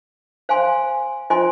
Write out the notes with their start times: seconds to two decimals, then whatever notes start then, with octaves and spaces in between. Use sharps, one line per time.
0.49 C5 F5 G#5 C6
1.30 F4 C5 D#5 G#5 C6